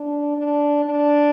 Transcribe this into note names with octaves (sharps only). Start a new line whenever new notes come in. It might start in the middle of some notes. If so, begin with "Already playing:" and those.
Already playing: D4
D4
D4